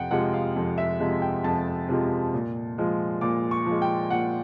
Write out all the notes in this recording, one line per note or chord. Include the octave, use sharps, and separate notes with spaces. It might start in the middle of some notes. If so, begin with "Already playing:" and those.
Already playing: F2 C3 F3 F#5 G5
C3 F3 G#3 F#5
F5
F2
E5
C3 F3 G#3
G5
F2 A5
C3 F3 G#3
A#2
F3 G#3
A#2 D6
C#6
F3 G#3
G5
A#2 F#5